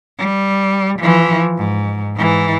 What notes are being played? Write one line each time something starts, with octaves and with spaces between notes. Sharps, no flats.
G3
E3 F3
G#2
G#2 E3